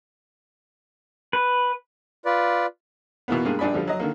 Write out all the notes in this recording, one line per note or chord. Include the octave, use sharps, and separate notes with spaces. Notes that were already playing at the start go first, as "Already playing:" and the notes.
B4
F4 B4 D5
B2 E3 A#3 B3
G2 G#3 A#3
A#1 G2 D4 G#5 B5
D3 F3 G3
F#3 D#5
D3 D#3 A#3